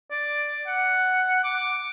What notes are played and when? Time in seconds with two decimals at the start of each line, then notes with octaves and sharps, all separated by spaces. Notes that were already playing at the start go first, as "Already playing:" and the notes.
0.11 D5
0.67 F#5
1.44 D6